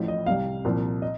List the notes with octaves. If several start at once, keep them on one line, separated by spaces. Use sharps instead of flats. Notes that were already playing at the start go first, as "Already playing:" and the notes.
Already playing: A1 A2 F3
D#5
C2 C3 G3 F5
C2 A#2 F3
D#5